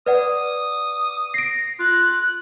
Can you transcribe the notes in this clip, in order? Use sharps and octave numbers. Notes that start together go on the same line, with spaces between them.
B4 D5 F#5 D#6
A#6 C7 D7
F4 F#6